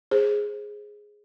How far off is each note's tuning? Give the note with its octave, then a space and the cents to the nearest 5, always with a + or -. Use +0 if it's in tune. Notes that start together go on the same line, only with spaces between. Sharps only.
G#4 +0 C5 +25